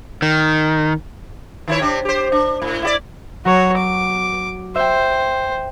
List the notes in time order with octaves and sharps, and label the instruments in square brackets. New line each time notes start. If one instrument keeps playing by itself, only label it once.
[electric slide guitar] D#3
[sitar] D#3 E4 C#5
C3 C4 D4
G4 C5
D4
A2
E4 F#4 D5
[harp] F#3 [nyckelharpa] F#4 C#5
[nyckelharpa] D6
[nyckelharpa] C5 [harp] E5 G5